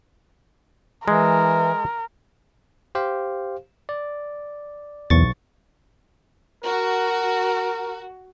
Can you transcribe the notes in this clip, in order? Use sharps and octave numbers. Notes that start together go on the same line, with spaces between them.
E3 G#3 A#4
G4 C5 F5
D5
B1 E2 C#6 A6
F#4 A#4